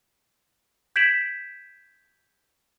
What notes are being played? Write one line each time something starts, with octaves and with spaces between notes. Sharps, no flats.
G6 G#6 B6 D7 E7 F#7